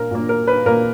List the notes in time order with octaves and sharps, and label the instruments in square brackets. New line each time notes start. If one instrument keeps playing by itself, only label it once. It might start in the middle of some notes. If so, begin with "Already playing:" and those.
Already playing: [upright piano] A#2 A#4
A#2 A#3
A#4
B4
A#2 A#3 A#4